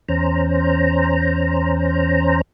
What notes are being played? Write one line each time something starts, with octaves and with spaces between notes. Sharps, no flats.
E2 C#4 C5 A#5